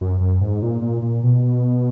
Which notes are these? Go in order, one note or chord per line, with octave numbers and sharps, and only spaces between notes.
F#2
F#2
G#2
A#2
A#2
A#2
B2